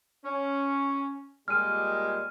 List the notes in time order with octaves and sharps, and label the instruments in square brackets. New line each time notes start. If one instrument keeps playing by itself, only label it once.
[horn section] C#4
[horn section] A#2 G3 G#3 [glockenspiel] F6 D#7